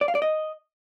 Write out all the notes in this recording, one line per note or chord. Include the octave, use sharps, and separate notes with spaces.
D5
F5
D5
D#5